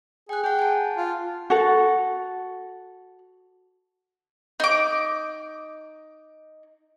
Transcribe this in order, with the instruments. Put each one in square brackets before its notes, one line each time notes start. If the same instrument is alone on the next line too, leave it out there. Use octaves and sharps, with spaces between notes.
[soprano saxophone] G#4 [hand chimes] G5 F#6
[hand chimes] G#4 F#5 [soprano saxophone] G5
[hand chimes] G#5 A5
[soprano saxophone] F4
[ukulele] F#4 A4
[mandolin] D#4 D6